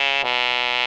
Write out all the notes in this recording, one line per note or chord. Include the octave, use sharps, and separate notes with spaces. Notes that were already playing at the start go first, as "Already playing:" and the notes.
Already playing: C#3
B2